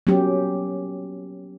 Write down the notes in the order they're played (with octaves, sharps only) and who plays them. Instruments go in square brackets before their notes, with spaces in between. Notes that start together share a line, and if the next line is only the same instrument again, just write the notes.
[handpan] F#3 A#3 B3 C#4 G4